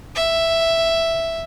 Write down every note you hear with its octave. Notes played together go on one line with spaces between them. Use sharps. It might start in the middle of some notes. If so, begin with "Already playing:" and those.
E5